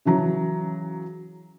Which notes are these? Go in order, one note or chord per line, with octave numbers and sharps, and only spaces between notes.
C#3 E3 F#3 A#5